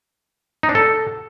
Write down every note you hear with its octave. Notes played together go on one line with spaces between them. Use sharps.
D#4
D4
A4